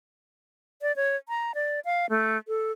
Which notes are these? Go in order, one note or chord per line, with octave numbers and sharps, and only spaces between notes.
D5
C#5
A#5
D5
F5
A3
A4